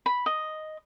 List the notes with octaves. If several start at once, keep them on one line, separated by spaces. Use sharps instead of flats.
B5
D#5